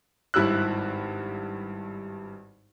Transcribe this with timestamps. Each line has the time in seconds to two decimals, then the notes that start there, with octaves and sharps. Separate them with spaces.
0.34 G#1 G2 E4 G4 E6 F#6